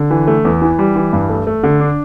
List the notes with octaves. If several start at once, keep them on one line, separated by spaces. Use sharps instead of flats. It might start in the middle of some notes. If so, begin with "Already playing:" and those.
Already playing: D3
E3
A3
E2
E3
G3
E3
G2
A3
A3
D3
D4